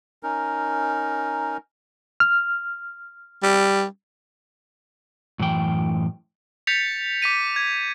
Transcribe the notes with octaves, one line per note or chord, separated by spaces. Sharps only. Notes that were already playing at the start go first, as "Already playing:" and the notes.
C#4 D#4 A#4
F6
G3
F#2 A2 E3 G5
G6 A6 B6 C#7 F7
D6 B6 D#7
G#6